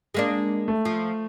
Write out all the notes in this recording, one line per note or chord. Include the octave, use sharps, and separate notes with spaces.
G#3 A#3 D4
A3
F3